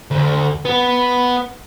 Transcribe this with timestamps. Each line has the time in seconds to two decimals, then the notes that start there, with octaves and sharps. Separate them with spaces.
0.11 D2
0.65 B3